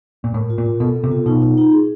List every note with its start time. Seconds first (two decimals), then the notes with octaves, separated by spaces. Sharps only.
0.24 A#2
0.34 A2 A#4
0.50 F4
0.58 A#2
0.66 F4
0.80 B2 A4
0.96 B3
1.04 C3
1.11 F4
1.26 B2 D#4
1.42 D#4
1.57 D#4
1.72 G#4